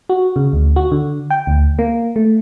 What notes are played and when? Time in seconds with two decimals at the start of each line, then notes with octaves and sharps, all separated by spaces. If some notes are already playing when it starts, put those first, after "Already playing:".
0.09 F#4
0.36 C#3
0.53 D2
0.76 F#4
0.91 D3
1.30 G5
1.47 D2
1.79 A#3
2.16 A3